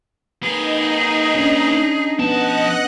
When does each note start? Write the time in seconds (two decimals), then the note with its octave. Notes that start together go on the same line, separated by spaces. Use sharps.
0.43 A#3 D#4 G#4 B4
1.35 C#4 D4
2.19 F3 B3 D#5 F#5 A5 F#6